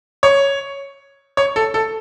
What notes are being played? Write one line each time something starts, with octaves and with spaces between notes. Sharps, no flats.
C#5
C#5
A4
A4